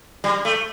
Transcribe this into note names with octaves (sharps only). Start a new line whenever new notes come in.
G3
A3